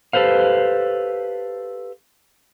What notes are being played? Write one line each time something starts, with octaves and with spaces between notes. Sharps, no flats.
G4 A4 B4 C5 F5